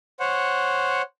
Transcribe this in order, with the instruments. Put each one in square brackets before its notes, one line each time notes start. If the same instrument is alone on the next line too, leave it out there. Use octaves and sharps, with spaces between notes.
[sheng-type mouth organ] C5 C#5 F#5